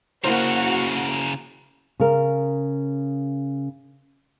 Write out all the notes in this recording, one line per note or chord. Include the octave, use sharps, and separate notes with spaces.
C#3 A#3 E4 F#4 A#4 C5
C#3 A#4